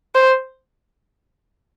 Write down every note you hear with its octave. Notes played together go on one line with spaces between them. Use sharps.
C5